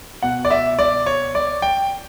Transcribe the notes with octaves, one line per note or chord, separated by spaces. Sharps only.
B2 F#5
D5
E5
D5
C#5
D5
G5